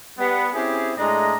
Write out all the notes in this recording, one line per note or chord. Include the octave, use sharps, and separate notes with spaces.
G3 B3
C4 C#4 E4 G4 G#4
A2 G#3 A3 D4 D#5 A#5